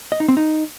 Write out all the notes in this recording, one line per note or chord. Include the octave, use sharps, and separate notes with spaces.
D#5
D#4
C4
D#4